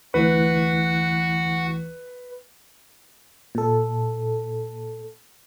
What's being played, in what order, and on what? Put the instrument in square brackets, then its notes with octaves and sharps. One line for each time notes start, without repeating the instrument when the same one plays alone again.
[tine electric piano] D2 E3 [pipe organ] F#4 F#5 [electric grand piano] B4
[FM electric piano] A#2 A4